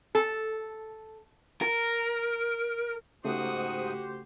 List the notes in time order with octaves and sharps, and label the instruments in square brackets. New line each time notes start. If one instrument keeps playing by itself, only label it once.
[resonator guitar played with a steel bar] A4
[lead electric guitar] A#4
[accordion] G#2 D#6 [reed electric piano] C#3 A3 [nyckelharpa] F#4 [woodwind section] G4 C5